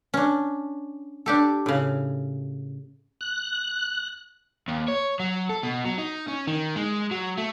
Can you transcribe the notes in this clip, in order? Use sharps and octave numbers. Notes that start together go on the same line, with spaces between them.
C#4 D4
D4 G4 A4
A2 C#3
F#6
D#2
C#5
F#3
A4
B2
F#3
D#4
C#4
D#3
G#3
F#3
A3